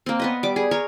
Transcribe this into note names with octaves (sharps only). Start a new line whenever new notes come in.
A#3 C4
B3 B4 D#5
G3 D6
G#4
A#4 C#5